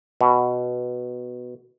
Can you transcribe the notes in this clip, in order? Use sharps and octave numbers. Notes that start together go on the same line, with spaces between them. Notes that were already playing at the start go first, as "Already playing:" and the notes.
B2